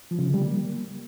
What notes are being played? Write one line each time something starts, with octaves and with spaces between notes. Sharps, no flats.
F3
C#3
D3
G3
A#3